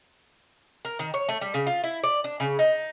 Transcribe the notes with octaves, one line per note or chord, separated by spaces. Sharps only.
A#4
D#3
C#5
A3
G3
C#3
F4
E4
D5
D4
C#3
D#4